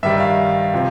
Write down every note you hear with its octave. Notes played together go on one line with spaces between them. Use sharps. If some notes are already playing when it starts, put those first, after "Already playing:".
G2 D#3 G3 E5
F5
C3 F3